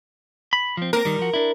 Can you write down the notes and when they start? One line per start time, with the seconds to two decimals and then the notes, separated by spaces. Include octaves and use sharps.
0.53 B5
0.77 F3 C4
0.93 A#3 C4 A#4
1.05 D#3 G3
1.19 F3 F#4
1.33 D4 E4